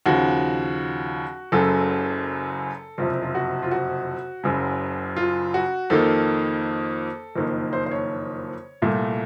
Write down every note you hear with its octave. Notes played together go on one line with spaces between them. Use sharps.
D#2 C#3 F3 F#4
F#1 F#2 C#3 F#3 A4
F#1 F2 C3 F4
F4
F#4
F4
F#4
F#1 F#2 C#3
F4
F#4
F2 D#3 A#3 A4
F#1 F2 D#3 A#3
C5
C5
C#5
C2 A#2 A3